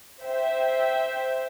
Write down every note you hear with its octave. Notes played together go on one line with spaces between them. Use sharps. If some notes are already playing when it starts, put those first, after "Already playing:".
C5 E5 G5